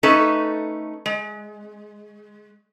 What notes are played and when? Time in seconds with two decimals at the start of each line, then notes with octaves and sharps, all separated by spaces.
0.03 A3 C#4 D#4 A4 B4
1.06 G#3